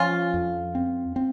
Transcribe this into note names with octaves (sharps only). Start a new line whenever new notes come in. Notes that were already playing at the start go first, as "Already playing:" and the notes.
Already playing: F3 C#4 F4
F2
C4
C4